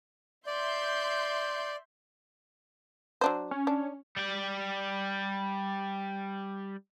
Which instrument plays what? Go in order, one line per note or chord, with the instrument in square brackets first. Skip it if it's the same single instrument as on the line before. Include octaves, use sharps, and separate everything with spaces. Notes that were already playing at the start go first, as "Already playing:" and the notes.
[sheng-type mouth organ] D5 [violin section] E5 C6 G6
[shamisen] F#3 D4 C5
[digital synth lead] C#4
[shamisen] D4
[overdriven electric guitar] G3 G5